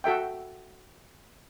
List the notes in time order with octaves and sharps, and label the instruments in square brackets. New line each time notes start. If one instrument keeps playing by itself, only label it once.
[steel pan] F#4 A4 E5 G5